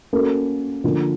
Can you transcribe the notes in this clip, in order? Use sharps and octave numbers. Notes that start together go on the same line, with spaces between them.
A#3 C#4 F#4 A4
D3 F3 A#3 D4